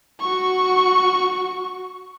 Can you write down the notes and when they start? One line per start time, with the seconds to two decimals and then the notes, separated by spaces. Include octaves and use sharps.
0.20 F#4 C#6